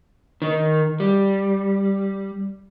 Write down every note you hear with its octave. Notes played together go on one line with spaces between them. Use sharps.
D#3
G3